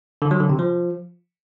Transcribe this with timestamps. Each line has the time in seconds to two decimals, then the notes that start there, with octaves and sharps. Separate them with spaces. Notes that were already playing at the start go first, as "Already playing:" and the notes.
0.22 D3
0.31 F#3
0.40 D3
0.50 C3
0.59 F3